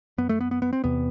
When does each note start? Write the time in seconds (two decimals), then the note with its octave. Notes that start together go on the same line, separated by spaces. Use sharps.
0.18 F#2 B3
0.29 A3
0.41 B3
0.51 B3
0.62 B3
0.73 C4
0.84 E2 C3 B3